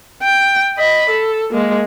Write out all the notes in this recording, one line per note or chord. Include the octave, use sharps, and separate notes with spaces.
G5
D#5 B5
A4
G#3 A#3